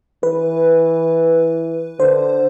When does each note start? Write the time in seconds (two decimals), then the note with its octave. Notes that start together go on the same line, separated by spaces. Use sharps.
0.23 E3 B4
1.99 D3 C5